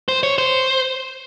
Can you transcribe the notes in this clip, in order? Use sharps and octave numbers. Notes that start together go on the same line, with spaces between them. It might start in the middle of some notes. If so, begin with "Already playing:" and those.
C5
C#5
C5